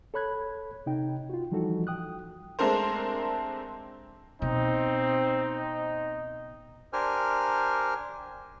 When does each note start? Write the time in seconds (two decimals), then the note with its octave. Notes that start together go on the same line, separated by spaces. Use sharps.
0.14 A4 C#5 B5 F#6 G#6
0.86 C3 D#4 G5
1.29 F4 F#4
1.51 E3 F3 G3 D#4 F#4 A4
1.87 G5 D#6 F#6
2.59 G#3 A3 C4 D4 A#4 C5
4.42 B2 C4 D#4
6.93 D4 G4 A#4 C5 G#5 F6